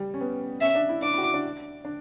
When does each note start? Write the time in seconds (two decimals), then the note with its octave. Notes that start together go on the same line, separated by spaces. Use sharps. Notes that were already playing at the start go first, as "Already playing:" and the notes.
Already playing: G3
0.14 C#4
0.21 B3
0.61 C#4 E5
0.75 D4
0.89 E4
1.02 D4 D6
1.13 E4
1.18 F#4
1.23 E4
1.34 D4
1.85 D4